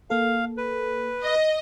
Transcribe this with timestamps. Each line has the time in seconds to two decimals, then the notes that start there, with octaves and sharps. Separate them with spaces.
0.10 A#3 A4 F5
0.57 B4
1.21 D#5